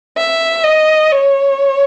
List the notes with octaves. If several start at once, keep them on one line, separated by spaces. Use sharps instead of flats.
E5
D#5
C#5